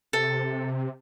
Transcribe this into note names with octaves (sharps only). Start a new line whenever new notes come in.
C3 A4